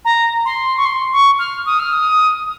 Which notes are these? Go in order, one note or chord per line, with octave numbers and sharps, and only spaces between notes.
A#5
C6
C#6
C6
C#6
F6
D#6
F6
D#6